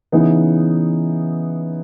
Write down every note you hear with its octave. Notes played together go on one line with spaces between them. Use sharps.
C#3 E3 B3 D#4